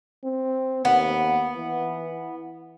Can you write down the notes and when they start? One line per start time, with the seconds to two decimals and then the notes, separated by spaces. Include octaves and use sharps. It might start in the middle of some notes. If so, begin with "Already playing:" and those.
0.24 C4
0.85 D#2 B3
1.57 E3